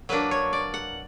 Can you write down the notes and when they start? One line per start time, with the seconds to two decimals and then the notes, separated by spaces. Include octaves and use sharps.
0.09 F#3 A#3 D4 B4
0.31 C#5
0.53 D5
0.74 F#5